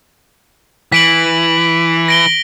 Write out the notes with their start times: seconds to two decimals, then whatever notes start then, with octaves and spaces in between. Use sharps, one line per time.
0.92 E3 B6 D7 F#7
2.08 A#6 D7 G7